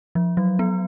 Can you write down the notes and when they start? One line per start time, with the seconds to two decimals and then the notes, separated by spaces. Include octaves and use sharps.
0.15 F3
0.37 F#3
0.59 B3